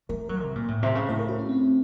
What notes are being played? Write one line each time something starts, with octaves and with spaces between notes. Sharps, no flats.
A3 A#4
F#3 A#4
C3
A#2
A2
C3
C#3
A2 C5
A#4
F#4
C#4
C4